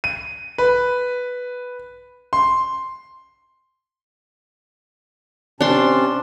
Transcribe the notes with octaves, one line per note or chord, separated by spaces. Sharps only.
D#7
B4
C6
C3 C#4 D4 A5 C6